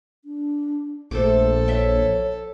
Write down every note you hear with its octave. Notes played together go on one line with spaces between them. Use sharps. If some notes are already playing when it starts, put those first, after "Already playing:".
D4
A#1 A3 A4 C5 D6
C#5 E5 G5